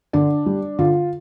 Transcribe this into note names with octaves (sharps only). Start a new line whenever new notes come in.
D3 D4
G3
D3 F4